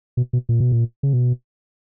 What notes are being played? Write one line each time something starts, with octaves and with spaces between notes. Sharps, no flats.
B2
B2
A#2
B2
A#2
C#3
B2